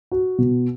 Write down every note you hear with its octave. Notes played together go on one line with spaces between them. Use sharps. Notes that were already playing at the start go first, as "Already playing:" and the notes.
F#4
B2